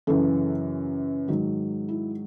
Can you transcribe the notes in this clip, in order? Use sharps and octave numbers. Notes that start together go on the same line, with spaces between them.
F#2 C#3 E3 A4
G#2 D#3 F#3
E4